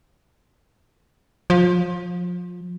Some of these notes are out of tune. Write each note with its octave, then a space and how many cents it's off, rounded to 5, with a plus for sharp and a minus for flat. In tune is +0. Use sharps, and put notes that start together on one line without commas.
F3 +25